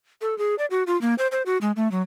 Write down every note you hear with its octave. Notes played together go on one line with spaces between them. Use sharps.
A4
G#4
D5
F#4
F4
A#3
C5
C5
F#4
G#3
A3
F#3